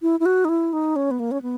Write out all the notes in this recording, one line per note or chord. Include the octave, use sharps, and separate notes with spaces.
E4
E4
F#4
D#4
E4
D#4
C#4
B3
A#3
C#4
B3